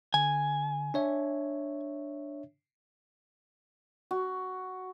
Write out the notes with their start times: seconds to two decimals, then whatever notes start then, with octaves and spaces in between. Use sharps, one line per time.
0.14 D3 G#5
0.94 D4 C#5 E5
4.11 F#4